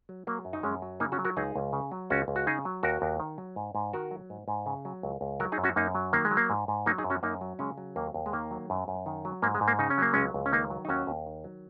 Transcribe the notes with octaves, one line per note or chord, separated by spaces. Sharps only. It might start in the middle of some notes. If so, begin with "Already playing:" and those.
F#3
F#3 A#3
F#2
D#4
F#2 G#3 C#4
F#3
C#3 A#3 D#4
C#4 F#4
F#3
F#4 A#4
C#2 D#4 G#4
C#2
C#3
F#3
C#2 C#4 F#4
C#2
F#4
C#3 D#4 G#4
F#3
D#2 F#4 A#4
D#2
D#3
F#3
G#2
G#2
D#3 F#4 A#4
F#3
G#2
G#2
C#3
F#3
C#2
C#2
F#3 F#4 A#4
D#4 G#4
F#2
C#4 F#4
F#2 A#3 D#4
F#3
D#3 A#3
G#3
F#3
A#3
G#2
G#2
F#3 A#3 D#4
D#4 G#4
F#2
C#4 F#4
F#2 A#3 D#4
F#3
C#3 G#3 C#4
F#3
D#2 A#3
D#2
G#3
D#3 A#3
F#3
F#2
F#2
D#3
F#3
G#2 A#3
G#3
G#2
A#3
C#3 D#4
C#4
F#3 A#3
C#2 G#3 C#4
C#2
C#4
D#3 A#3 D#4
F#3
D#4
D#2 C#4 F#4
D#2
D#3
F#3